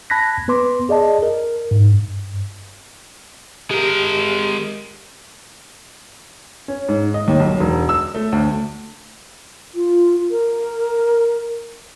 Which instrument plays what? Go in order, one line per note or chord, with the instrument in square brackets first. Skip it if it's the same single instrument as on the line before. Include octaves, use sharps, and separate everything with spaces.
[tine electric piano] A5 B5 F#6 G#6 A#6 B6
B3 B4 C6 D6
G#4 D5 D#5 A5
A#4
G#2
G2
[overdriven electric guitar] G#3 A#4 [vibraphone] G4
[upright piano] C#4
G#2
D#5
D#2
B1
E1
E6
A3
D2
[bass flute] F4
A#4